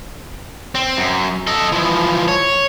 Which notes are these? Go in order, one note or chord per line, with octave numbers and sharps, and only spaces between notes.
C4
F#2
A4 D#5
E3 F3
C#5